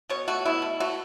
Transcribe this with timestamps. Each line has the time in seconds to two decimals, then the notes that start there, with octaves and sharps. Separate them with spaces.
0.10 B2 C#5
0.28 A3 F#4
0.45 B2 E4
0.62 A3
0.80 A3 F#4